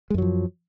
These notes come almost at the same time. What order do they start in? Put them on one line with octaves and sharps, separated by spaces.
G#3 F#2 F#3 F3